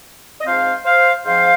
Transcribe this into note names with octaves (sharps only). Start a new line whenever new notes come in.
D#5
G#2 F3 C4 C5 F5
C5 F5
G#2 F3 C4 C5 F5